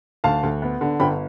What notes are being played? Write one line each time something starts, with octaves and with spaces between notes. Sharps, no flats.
D2 F5 A5
D2
B3
D3
G1 G5 B5